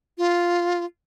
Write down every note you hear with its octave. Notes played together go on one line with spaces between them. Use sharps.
F4